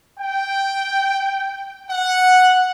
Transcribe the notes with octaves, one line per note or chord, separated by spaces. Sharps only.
G5
F#5